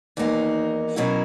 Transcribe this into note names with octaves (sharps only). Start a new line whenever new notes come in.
E2 D#3 A#3 D#4 F#4
B2 F#3 C#4 E4 A#4